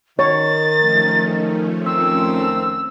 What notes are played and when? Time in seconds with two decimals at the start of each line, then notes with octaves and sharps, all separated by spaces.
0.19 D#3 C#5 A6
0.76 F3 A3 C#4
1.86 F2 D#3 C4 E6